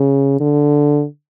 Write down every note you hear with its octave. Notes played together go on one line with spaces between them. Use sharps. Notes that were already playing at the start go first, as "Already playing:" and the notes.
Already playing: C#3
D3